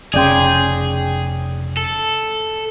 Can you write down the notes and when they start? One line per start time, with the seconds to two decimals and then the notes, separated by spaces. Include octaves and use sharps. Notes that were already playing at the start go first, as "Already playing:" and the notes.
0.13 F1 C#3 G#4 D5 G5 C6
1.77 A4